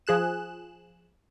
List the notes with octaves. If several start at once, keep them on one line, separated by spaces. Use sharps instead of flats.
F3 G#4 F#6 E7